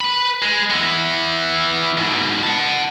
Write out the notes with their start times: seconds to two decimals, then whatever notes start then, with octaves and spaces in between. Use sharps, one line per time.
0.01 B4 B5
0.42 G#3
0.70 E3 B3
1.97 G#2 B2
2.43 F#5 A5